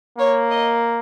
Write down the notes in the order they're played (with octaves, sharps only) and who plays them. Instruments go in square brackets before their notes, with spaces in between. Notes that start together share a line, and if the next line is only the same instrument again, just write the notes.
[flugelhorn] A#3 [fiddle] C#5
[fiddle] D#5